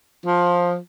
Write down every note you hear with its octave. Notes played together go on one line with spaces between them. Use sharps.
F3